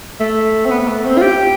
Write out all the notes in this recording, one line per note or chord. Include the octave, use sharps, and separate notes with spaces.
A3
C4
B3
A3
C4
F4
G4